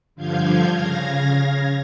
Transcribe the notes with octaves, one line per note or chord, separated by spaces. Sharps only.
G2 D3 F3 F5 G6 G#6
C#3 F5 G#6 A#6